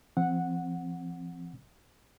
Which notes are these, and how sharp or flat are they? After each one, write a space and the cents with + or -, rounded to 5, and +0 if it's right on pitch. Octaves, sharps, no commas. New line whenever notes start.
F3 -40 C4 +0 F#5 -10